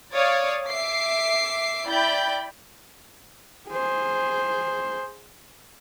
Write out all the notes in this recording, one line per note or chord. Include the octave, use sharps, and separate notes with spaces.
C#5 D5 F5 D#6
E5 D6 C7
E4 D5 G5 B5 G6
G#4 C5